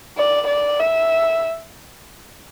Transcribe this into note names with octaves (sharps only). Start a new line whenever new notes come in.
D5
D5
E5